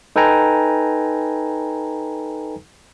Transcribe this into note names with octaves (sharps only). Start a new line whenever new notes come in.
D#4 A4 B4 G5 G#5 A#5